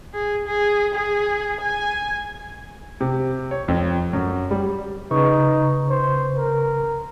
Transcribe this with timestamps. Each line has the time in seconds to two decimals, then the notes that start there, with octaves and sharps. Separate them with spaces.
0.14 G#4
0.47 G#4
0.94 G#4
1.60 G#5
3.01 C3
3.51 C#5
3.68 F2
4.13 F#2
4.51 G3
5.11 C#3 D#4 B4 C#6
5.90 C5
6.38 A#4